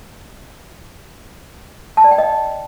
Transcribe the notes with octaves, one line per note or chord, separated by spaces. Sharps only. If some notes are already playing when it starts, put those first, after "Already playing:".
A5
D5
G5
D#5